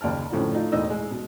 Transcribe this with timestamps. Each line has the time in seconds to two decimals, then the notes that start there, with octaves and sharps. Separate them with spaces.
0.01 F#1 D#2 D5 A5 F6
0.32 F#2 A2 D3 F3
0.53 A3 D#4 F4
0.72 E1 A2 D#4 D#5 E6
0.90 G#3
1.10 B2